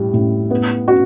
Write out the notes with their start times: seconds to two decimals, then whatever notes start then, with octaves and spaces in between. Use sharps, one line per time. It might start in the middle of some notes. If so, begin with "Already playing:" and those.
Already playing: A2 G3
0.13 A2
0.51 B3
0.88 F#4